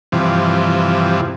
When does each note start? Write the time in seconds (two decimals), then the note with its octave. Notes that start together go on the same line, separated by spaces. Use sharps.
0.12 G2 C3 E3 F3